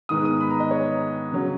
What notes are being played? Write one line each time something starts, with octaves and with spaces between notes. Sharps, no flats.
G#2 D#3 G#3 B3 D#6
D#6
B5
A#5
D#5
C#5
C#3 F#3 C#4